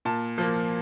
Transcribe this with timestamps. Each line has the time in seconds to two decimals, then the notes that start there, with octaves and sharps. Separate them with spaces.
0.05 A#2 A5
0.38 F3 A#3